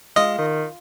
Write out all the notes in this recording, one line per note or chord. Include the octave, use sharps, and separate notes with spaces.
G#3 F4 D#5
D#3